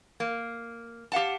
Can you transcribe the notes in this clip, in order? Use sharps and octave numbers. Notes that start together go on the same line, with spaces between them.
A#3
G4 F5 F#5 A5